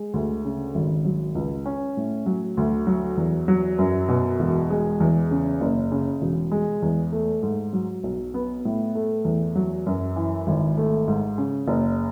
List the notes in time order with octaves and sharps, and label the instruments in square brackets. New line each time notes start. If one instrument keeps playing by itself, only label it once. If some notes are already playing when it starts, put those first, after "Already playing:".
Already playing: [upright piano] G#3
D2
C#3
G#1
F#3
C#2
C#4
A2
F#3
D2
F#3
E2
F#3
F#2
B2
E1
G#3
E2
C#3
F#1
C#3
E1
G#3
E2
A3
G#2
F#3
B1
B3
A2
A3
E2
F#3
F#2
E3
G#1
A3
G#2
C#3
F#1